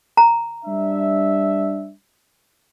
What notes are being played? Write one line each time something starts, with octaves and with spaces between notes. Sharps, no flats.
A#5
G3 D4 E5